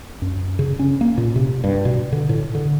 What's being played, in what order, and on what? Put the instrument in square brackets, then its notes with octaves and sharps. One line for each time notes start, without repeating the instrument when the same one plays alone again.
[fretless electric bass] F#2
C#3
C#4
A#3
A#2
C3
G2
B2
D3
A2
D3